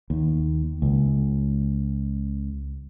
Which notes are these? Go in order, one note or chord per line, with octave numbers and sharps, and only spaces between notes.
D#2
C#2